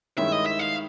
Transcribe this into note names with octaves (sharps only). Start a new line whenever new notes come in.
G2 D#3 G#3 C#4 E4 E5
D#5
E5
F5